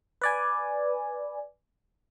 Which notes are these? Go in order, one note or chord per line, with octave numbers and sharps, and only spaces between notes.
B4 D5 G#5